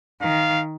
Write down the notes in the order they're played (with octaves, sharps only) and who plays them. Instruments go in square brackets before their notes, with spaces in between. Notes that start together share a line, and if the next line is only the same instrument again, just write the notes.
[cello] D#3 [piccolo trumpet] F5